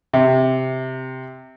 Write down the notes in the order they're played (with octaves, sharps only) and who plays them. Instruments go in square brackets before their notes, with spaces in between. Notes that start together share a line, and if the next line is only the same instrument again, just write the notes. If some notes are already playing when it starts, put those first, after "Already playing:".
[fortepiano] C3